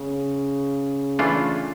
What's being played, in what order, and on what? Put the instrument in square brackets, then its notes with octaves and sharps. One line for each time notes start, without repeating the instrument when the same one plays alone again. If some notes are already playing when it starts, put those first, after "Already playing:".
Already playing: [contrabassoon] C#3
[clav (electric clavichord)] E3 A3 D4 F4